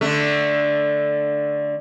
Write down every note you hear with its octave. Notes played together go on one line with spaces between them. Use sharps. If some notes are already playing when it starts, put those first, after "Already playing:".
D3 A3